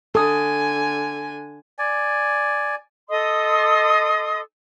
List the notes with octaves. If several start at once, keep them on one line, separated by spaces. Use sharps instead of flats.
D3 A4 G#5 D#6
D5 G#5
A4 D#5 C6 D#6